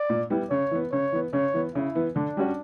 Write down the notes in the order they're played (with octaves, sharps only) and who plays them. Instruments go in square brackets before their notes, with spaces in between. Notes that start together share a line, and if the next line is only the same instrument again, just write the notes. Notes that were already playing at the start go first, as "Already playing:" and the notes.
Already playing: [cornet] D5
[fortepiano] A#2
G3 B3 E4
[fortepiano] C#3 [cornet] C#5
[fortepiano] E3 B3
[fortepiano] C#3 [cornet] C#5
[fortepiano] E3 B3
[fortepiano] C#3 [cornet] C#5
[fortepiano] E3 B3
[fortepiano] C#3 [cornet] E4
[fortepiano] E3 B3
[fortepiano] D3 [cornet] D4
[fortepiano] G3 C#4 F#4